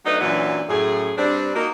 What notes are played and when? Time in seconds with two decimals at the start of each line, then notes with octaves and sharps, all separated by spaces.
0.06 F#3 A3 D4 D#4 B4
0.20 F#2 A#2 E3 F#3 D4 B4
0.68 F#2 A2 G#4
1.17 G2 G3 C4 D4
1.55 A#3 D#4 F#4